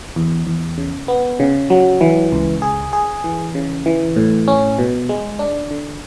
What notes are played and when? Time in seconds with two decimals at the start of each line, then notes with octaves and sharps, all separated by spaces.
0.16 E2
0.47 E2
0.77 C#3
1.08 B3
1.40 C#3
1.70 F#3
2.01 E3
2.32 C#2
2.62 G#4
2.93 G#4
3.24 E3
3.55 C#3
3.86 E3
4.16 A2
4.48 C#4
4.78 B2
5.09 G#3
5.39 D4
5.71 D3